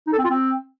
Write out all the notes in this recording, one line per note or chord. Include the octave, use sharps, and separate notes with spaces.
D#4
A4
C4
F4
C4